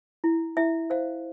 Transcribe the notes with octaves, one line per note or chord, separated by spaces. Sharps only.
E4
E4 E5
C5 F5